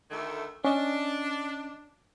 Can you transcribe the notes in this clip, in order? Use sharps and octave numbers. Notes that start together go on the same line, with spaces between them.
D2 D#3 A3
C#4 D4 D#5